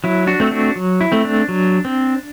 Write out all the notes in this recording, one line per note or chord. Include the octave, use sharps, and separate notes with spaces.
F#3 E4
D4 F#4
A3 C4
D4 F#4
F#3
E4
A3 C4
D4
F#3
C4